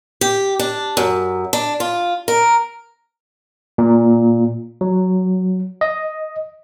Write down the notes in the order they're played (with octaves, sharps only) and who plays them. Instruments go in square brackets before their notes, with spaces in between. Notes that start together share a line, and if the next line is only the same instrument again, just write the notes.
[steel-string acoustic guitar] G4
D4
F#2
D4
F4
A#4
[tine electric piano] A#2
F#3
D#5